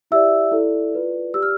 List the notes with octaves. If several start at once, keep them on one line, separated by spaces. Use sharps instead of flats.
E4 G4 D5 E5 E6
E4 A4 D5
F4 B4 D5
G4 D5 E6
F6